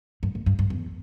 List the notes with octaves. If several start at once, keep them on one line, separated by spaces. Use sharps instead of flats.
G2
G#2
G2
G2
E2